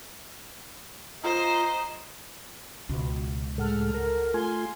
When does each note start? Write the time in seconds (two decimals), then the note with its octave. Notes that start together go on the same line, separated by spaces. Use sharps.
1.24 F4 C5 D#5 A#5
2.89 C#2 B2
3.58 A2 G#3 A4 F#5 F6
3.94 A#4
4.34 A3 F4 G#5 C6 G#6